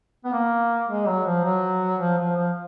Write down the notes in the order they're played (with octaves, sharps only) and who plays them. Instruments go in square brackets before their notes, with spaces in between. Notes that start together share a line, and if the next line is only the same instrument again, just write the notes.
[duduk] B3
A#3
G#3
F#3
F3
F#3
F3
F3
F3